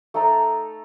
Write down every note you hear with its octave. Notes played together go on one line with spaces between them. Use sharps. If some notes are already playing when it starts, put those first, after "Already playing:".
A3 D#4 A4 A#5